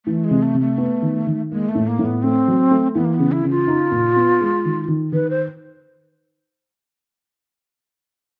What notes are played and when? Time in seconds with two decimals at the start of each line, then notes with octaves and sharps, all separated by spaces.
0.06 E3 A3
0.24 G#3
0.31 C3
0.42 A3
0.54 C3
0.61 A3
0.78 B3
1.02 D#3
1.27 D#3
1.52 G#3 A#3
1.69 A3
1.75 A2
1.87 A#3
1.99 A2
2.05 B3
2.23 A3 C4
2.48 F#3
2.71 A3
2.95 E3 B3
3.05 A#3
3.14 B3
3.19 C#3
3.32 E4
3.43 C#3
3.50 F4
3.67 D#4
3.92 A#2
4.16 B3
4.41 G#3
4.65 D#3
4.88 D#3
5.12 D#3 B4
5.30 C5